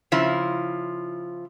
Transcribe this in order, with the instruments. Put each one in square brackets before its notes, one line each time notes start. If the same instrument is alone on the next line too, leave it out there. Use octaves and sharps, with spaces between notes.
[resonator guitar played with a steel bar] C#3 F3 E4